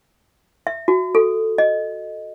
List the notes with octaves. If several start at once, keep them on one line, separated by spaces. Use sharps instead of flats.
E5
F#4
A4
D#5